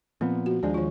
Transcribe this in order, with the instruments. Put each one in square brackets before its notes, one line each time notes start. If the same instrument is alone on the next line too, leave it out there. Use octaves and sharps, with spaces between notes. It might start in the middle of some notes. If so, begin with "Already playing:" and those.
[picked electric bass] A#2 F3 B3 [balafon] C4
[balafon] F#4
[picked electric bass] D#2 F3 G#3 [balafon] D4 D5
[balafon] D#3 F4